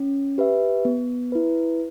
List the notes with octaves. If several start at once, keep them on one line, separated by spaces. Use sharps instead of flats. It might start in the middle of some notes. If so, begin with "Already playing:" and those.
Already playing: C#4
G4 B4 E5
B3
E4 B4